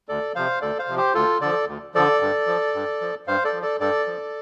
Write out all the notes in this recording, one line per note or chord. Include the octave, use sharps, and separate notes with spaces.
D2 A4 D5
C3 F3 C5 F5
D2 A4 D5
C5 F5
C3 F3
G4 C5
D2 F4 A4
D3 F3 A4 D5
D2
D3 F3 A4 D5
G2
F3
G2
F3
G2 C5 F5
A4 D5
F3
A4 D5
G2 A4 D5
F3